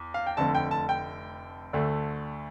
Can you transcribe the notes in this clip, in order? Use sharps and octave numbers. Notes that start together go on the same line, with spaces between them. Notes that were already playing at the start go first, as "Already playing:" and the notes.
Already playing: E2
F5
G5
F1 F2 D3 A3 A5
G5
A5
G5
D2 D3 A3